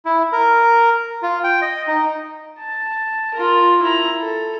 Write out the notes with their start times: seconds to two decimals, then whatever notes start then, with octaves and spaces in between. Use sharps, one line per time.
0.05 E4
0.32 A#4
1.23 F4
1.44 G5
1.62 D#5
1.87 D#4
2.59 A5
3.34 F4 A#4
3.82 E4 A#5
4.21 A4